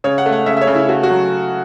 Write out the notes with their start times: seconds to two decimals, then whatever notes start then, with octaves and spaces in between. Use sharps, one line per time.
0.04 C#3 C#5
0.18 F#5
0.26 A3
0.32 F#5
0.46 C#3 E5
0.57 E5
0.61 C#5
0.67 C#3
0.75 E4
0.89 A3 F#4
1.03 F#4
1.10 F#3